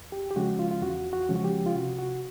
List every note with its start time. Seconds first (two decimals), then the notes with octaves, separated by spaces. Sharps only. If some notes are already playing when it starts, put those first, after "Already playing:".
Already playing: E2
0.12 G4
0.31 G4
0.36 C#3 F3 G#3 C#4 F#4
0.59 F4
0.71 F4
0.82 E2 F#4
1.13 F#4
1.29 C#3 F3 G#3 C#4
1.35 F#4
1.44 G4
1.66 F4
1.75 C3 F#4
1.98 F#4